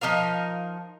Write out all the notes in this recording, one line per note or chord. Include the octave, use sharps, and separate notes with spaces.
F3 D#4 A#4 F5